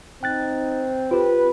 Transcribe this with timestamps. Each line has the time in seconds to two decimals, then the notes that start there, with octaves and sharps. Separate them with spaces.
0.23 C4 D#4 G5 F#6 A6
1.11 F4 G4 B4